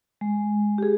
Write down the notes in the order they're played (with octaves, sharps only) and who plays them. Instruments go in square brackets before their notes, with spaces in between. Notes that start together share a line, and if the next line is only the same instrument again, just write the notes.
[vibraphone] G#3
G4 G#4